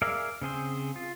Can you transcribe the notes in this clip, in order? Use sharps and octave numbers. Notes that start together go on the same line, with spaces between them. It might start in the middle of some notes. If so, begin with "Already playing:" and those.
G#4 A#4 D5 E5 F5
C#3 C4 G#4 C5
F4